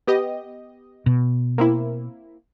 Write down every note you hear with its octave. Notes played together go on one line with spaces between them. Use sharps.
B3 G4 D#5
B2
A#3 C4 E4